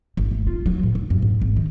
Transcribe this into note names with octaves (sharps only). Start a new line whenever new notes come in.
G1
A3
F4
F#3
A2
D3
F#2
G#2
G#1
D#3